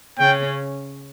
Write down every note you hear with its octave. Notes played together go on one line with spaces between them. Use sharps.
C#3 C#4 G5